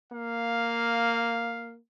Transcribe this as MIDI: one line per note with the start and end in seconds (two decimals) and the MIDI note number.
0.12 1.77 58
0.12 1.74 77